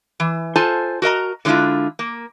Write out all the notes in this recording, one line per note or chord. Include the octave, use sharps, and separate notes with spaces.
E3
F4 A4 C5 G#5 A5
F#4 A#4 D#5 A#5
D3 F#3 G#3 D4 E4 F4
A#3